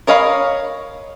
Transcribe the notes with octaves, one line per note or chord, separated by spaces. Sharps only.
A#4 C#5 D#5 F5 B5